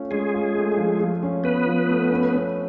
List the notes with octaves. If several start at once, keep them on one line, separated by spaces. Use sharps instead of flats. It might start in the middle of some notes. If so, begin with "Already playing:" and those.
Already playing: A3 C#4 F4
G#3 C#4 G#4
F4
A3
F3
F3
C#4
B3 F4 B4
F3
A3
C#4
C#4